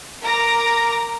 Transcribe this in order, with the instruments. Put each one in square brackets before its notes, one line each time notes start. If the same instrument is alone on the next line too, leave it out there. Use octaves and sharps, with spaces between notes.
[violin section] A#4 A#5 D6 A#6